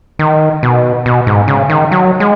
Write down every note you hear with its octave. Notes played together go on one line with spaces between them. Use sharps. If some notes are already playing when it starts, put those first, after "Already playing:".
D#3
B2
B2
G#2
C#3
D#3
F#3
G#3